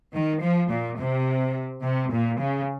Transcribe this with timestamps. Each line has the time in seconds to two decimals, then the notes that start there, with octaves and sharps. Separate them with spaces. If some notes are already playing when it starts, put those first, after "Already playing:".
0.14 D#3
0.41 F3
0.69 A#2
0.98 C3
1.83 C3
2.11 A#2
2.40 C#3